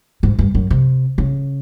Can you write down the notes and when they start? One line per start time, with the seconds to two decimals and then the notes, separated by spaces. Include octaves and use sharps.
0.23 G#2
0.39 G2
0.55 F#2
0.70 C3
1.18 C#3